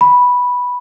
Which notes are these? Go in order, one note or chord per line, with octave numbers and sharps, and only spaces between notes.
B5